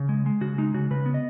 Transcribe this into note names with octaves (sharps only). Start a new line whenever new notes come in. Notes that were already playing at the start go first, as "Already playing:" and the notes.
Already playing: C#3
G#3
G#3
C#3 F#4
G#3 D#4
C#3 F#4
C#3 B4
B3
D#5